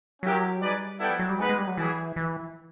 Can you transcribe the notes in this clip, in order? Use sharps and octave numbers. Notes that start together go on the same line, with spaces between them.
F#3 C#4 E4 G4 A#4
G3 D#4 G#4 B4 D5
B3 E4 A4 D5 G5
F3
F#3
G3
G#3 B3 D#4 G#4 B4
G#3
G3
F#3
E3 G3 B3 E4 G#4
E3